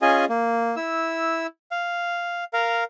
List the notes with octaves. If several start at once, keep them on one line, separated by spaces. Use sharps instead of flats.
C#4 F4 G#4 D#5 G#5
A#3
E4 E6
F5
A#4 F5